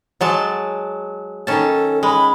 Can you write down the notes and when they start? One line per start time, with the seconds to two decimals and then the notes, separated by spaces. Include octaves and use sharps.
0.21 F#3 G#3 A5
1.47 D#3 C#4 A4 A5
2.03 G#3 B5